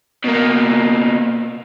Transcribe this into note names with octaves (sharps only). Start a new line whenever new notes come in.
B2 A#3